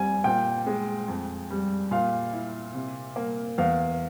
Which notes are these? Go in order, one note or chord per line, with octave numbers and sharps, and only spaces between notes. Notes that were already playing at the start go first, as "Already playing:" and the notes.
Already playing: F2 G3 G#5
A#2 G5
G#3
F2
G3
A#2 F5
E4
C3
A#3
E2 F5